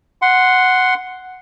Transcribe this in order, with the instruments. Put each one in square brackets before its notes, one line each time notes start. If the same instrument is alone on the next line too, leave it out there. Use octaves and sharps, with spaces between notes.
[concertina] F#5 C6